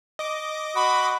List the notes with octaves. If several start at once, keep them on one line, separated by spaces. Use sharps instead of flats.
D#5 D6
F#4 B5